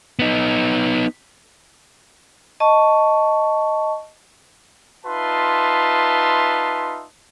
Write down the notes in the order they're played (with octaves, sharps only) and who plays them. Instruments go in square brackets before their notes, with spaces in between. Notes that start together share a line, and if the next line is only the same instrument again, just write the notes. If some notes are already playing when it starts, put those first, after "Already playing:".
[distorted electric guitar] B3 D#4
[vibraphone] D#5 A5 C#6
[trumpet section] D#4 F4 B4 E5 A5 C6